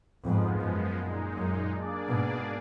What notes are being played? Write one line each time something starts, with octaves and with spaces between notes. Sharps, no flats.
F2 G#2 F3 G#3 B3
F#2
A#2 G#3 D#4
F#2
A#3 D4 G#4 D5
G#2 B2